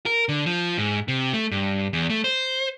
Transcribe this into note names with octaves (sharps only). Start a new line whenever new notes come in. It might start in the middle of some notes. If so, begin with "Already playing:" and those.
A#4
D3
F3
G#2
C3
A3
G2
E2
A3
C5